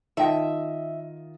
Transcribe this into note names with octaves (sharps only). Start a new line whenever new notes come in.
D#3 F4 D#5 E5 G5 A5